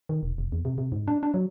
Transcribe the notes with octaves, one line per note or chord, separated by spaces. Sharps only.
D#3
E1
F1
E2
C3
C3
G#2
D4
D4
F#3